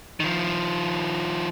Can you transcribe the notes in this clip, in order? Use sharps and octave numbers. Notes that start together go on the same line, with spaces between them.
D#3 F3